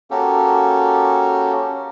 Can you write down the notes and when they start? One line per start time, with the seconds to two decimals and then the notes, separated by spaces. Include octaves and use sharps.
0.11 A#3 C#4 F#4 G4 A4